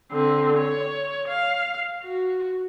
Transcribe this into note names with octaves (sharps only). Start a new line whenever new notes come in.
D3 C4
C#5
F5
F#4